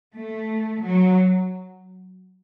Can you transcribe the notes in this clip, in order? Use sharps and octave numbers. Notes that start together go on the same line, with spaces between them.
A3
F#3